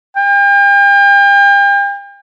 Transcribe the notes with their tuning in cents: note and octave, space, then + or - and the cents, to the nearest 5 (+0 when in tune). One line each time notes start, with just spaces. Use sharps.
G5 +40